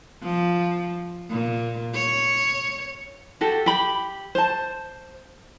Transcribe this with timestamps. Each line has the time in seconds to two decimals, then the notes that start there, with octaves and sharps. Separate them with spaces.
0.23 F3
1.30 A#2
1.94 C#5
3.41 F#4 G4 A4
3.66 G4 B5
4.35 C5 A5